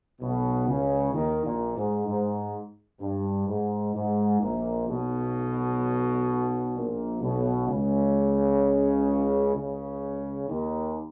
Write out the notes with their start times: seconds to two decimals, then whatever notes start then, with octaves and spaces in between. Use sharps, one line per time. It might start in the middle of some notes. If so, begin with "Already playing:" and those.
0.21 B1 B2
0.67 C#2 C#3
1.13 D#2 D#3
1.45 A#1 A#2
1.77 G#2
2.07 G#2
3.00 G2
3.48 G#2
3.95 G#2
4.41 A#1 A#2
4.88 B1 B2
6.75 A#1 A#2
7.21 B1 B2
7.68 C#2 C#3
9.55 C#2 C#3
10.49 D#2 D#3